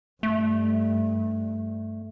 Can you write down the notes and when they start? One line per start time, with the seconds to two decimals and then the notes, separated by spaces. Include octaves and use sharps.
0.23 G2 A3